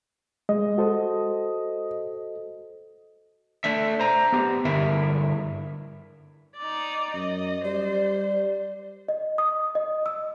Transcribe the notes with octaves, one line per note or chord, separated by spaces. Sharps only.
G#3 D#5
F#4 A4 C5
A3 D4 E5
C5 A#5
B3 G4
G2 D3 E4 A#4 E5
D#4 D5
F#2 D#5
G3 C5 D5
D#5
D#6
D#5
E6